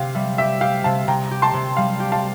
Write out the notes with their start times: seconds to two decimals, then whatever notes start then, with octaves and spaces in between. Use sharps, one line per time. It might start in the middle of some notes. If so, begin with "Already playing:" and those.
Already playing: C3 G4 F5
0.15 G3 E5
0.38 G4 E5
0.61 G4 F5
0.84 C3 F5 A5
1.07 C3 G5 A#5
1.31 G4
1.42 A5 C6
1.54 C3
1.77 G3 F5
2.00 G4
2.12 F5 A5